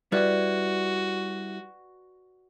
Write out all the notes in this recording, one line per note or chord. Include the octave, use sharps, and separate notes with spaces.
G3 E4 F#4 B4 D5 F#6